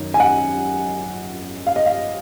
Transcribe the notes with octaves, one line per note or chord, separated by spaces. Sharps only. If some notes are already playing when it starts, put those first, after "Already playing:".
Already playing: F#2 D#3 D#4
G#5
F#5
F5
D#5
F5